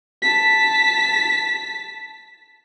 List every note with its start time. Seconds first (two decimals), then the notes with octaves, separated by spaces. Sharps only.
0.22 A5 B6